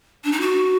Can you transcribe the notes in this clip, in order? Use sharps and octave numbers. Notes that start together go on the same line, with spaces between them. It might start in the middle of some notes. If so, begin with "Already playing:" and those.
D4
D#4
F#4